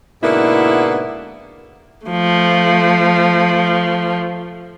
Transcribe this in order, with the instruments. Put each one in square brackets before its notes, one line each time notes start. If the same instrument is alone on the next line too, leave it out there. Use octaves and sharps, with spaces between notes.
[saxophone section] G#2 B2 D3 A#3 B3 E4
[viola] F3 A3